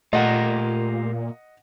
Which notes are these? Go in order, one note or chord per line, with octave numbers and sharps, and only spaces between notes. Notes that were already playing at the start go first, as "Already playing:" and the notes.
A#2 A3 F4 G4 A#4 D#5 F#5